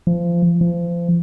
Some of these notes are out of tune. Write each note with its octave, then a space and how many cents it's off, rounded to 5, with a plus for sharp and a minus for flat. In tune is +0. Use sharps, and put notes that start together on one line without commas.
F3 -25
F3 -30